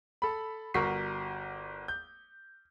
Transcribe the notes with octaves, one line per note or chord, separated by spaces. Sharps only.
A4 B5
G1 F#4 A#4 C#6 B6 C7
G6